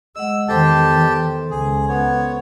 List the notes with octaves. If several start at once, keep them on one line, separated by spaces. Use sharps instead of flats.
G#3 D#5 F#5 E6
E2 D#3 G4 A4 C5 G5 A5 C6
C#2 G#4
B3 C#5